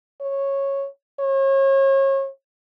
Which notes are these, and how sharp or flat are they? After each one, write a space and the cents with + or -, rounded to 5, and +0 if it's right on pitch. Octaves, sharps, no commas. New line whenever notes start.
C#5 -10
C#5 -35